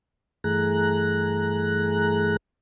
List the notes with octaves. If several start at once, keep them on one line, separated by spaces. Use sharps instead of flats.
G2 E3 A3 G#4 A#5 F#6